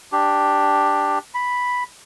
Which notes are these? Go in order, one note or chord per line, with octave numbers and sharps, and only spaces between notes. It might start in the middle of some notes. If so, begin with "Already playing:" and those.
D4 G4
B5